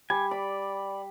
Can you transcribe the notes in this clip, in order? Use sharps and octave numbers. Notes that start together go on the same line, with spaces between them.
G3 G#5
D5 B5